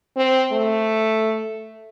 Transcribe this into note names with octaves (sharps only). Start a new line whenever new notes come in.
C4
A3